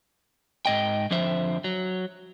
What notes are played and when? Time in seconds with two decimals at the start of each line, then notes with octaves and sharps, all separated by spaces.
0.66 G#2 D#5 G5
1.11 F2 D3 F3 C5 E5
1.64 F#3